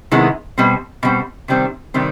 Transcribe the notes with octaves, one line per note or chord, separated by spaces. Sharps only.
C3 D#3 G#3 B3 E4
B2 G3 C4
B2 G3 C4
C3 D#3 G3 C4
C3 D#3 G3 C4